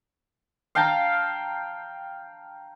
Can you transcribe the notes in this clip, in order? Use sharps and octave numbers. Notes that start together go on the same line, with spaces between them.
F5 G5 A5 A#5